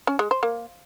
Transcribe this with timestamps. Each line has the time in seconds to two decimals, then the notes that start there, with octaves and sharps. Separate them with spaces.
0.07 C#4
0.19 G#3
0.31 C5
0.43 A#3